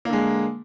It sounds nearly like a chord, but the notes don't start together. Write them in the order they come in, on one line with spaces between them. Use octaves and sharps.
A#3 D3 G#3